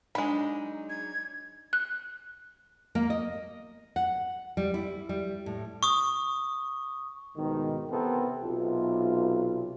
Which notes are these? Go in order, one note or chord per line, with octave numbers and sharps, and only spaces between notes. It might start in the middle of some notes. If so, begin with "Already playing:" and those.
F#3 G#3 D4 D#4 B5
G#6
F#6
A#3
D#5
F#5
G3
E4
G3
A2
C#6 D#6
C2 G#2 B2 D#3
C3 E3 B3 C4 A4 A#4
B1 C3 F4